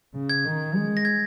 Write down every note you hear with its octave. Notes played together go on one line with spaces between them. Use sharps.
C#3
G#6
D#3
G#3
A#6
G#6